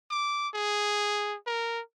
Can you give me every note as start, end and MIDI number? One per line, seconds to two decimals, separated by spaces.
0.11 0.49 86
0.54 1.36 68
1.47 1.81 70